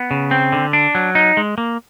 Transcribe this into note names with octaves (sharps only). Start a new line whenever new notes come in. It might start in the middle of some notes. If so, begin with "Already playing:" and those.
Already playing: B3
C#3
C4
D3
D4
F#3
D#4
G#3
A#3